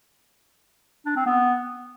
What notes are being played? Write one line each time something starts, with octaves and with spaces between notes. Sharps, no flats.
D4
C4
B3